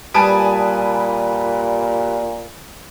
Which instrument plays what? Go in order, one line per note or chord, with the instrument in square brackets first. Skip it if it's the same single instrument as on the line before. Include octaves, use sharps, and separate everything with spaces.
[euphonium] A#2 [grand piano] G3 B4 D7 [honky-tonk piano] G#5 A5 D#6